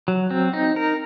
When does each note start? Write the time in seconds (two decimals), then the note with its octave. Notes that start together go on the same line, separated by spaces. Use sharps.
0.08 F#3
0.31 C4
0.53 D#4
0.76 A#4